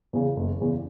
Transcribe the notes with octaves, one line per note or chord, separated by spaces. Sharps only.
E2 C#3
F#1
E2 C#3